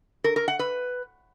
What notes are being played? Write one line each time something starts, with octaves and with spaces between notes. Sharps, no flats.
A#4
A#4
F#5
B4